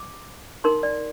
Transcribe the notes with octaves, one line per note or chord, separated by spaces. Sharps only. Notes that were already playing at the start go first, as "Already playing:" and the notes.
Already playing: D6
D#4 A#4 C6
D5